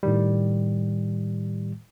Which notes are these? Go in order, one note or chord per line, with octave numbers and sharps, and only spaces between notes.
A2 D#3 G3